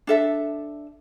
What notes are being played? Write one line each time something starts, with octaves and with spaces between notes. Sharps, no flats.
D4 A4 E5